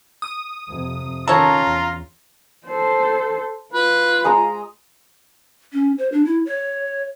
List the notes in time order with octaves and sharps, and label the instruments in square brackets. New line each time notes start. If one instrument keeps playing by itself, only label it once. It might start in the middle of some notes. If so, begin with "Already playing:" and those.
[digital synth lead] D#6
[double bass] F2 C3
[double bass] D#3 C#4 [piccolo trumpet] F4 [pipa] A4 C#5 [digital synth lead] A#5
[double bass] E2
[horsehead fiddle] A4 C5
[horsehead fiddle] F4 [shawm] B4
[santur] G#3 D#5 A#5
[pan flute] C#4
C5
D4
E4
C#5